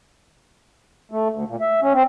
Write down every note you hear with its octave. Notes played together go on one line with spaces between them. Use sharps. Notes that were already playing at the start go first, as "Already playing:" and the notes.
A3
D2
A#2
E5
C#4
C4